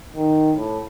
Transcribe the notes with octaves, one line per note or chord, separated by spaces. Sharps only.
D#3
A2